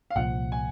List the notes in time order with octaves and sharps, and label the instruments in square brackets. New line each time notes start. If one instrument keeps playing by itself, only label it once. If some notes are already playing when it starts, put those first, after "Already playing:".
[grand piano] F5
[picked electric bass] C2 A#2 F3 [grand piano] F#5
[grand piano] G#5